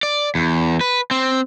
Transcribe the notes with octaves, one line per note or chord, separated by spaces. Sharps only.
D5
E2
B4
C4